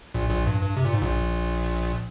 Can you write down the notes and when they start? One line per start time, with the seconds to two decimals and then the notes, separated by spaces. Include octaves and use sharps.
0.14 A#1 A#2
0.30 A#1 A#2
0.46 G2
0.61 G2
0.77 C3
0.85 A#2
0.94 G#2
1.02 A#1 A#2